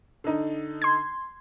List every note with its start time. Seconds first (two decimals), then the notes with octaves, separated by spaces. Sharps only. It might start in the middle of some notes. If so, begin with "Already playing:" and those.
0.24 D3 D#4
0.82 C6 G#6